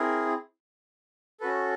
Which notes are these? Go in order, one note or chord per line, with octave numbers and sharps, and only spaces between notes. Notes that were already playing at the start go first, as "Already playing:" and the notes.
Already playing: C4 E4 G#4 A#4
C#4 F#4 A4 B4